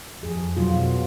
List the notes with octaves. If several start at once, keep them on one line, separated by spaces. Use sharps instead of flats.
F2 G#4
B2 F#3 F4